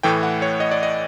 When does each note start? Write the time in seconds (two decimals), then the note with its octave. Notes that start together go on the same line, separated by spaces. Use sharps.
0.03 A2 E3 A3 G5
0.23 F#5
0.42 C#5
0.60 D#5
0.71 D5
0.83 D#5